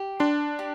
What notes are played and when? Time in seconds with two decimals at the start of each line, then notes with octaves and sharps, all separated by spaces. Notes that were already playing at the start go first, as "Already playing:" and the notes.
Already playing: G4
0.20 D4 C6
0.59 G4